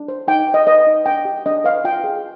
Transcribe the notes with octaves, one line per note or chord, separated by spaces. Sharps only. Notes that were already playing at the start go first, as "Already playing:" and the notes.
Already playing: D4
C5
D#4 G5
B4
D#5
B4 D#5
D#4
D4 G5
G4
D4 D#5
B4 F5
F4 G5
G#4